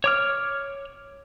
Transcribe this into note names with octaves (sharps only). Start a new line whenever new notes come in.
C#5 D6 F6